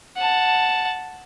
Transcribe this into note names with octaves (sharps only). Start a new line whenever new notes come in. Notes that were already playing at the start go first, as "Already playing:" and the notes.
F#5 A5